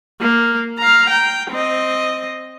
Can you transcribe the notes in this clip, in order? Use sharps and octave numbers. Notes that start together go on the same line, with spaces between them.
A#3
F5 A#5
G5
C4 D#5